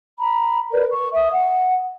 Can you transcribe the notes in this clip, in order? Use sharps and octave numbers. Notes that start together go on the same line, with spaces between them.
A#5 B5
A#4 B4 D5
C#6
E5 D#6
F#5